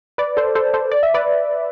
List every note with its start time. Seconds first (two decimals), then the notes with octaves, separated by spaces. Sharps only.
0.18 B4 D5
0.37 A4 C5
0.55 A4 C5
0.74 A4 C5
0.91 D5
1.03 E5
1.14 B4 D5